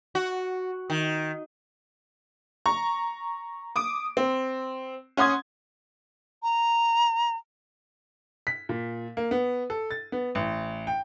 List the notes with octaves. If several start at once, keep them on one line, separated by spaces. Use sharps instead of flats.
F#4
D#3
A#5 C#6
D6 D#6 D7
C4
C#4 F#5 C6 D#6 G#6
A#5
B6
A#2
A#3
B3
A4
A6
B3
A1
G5